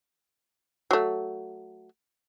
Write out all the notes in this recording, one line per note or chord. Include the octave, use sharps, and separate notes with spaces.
F#3 A3